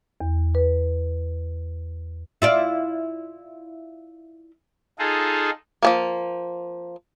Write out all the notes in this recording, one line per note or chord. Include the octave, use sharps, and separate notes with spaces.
E2
B4
E4 F4 D5
D#4 F4 G#4 A4
F3 A3 A#3